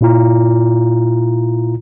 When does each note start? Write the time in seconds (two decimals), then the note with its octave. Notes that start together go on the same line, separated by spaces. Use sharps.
0.01 A#2 E4 F4 A#5